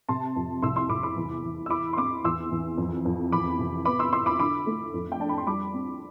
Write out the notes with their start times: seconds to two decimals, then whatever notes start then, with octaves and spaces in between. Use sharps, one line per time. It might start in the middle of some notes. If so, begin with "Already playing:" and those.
0.09 C3 A5 C6
0.36 F2
0.62 C2 C6 E6
0.76 C6 E6
0.89 C2 B5 D6
1.03 B5 D6
1.16 E2
1.43 E2
1.66 E6
1.70 E4 B5 D6
1.93 C6
1.97 C4 B5 D6
2.24 E2 C6 E6
2.51 E2
2.78 F2
3.05 F2
3.32 E2 B5 D6
3.59 C3
3.85 B3 B5 D6
3.99 C6 E6
4.13 E4 C6 E6
4.26 B5 D6
4.39 D3 B5 D6
4.67 A3
4.94 F2
5.12 G5
5.20 D4 A5
5.29 B5
5.38 C6
5.47 G3 B5 D6
5.74 C4